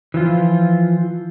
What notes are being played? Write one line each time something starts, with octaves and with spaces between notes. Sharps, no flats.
E3 F3 F4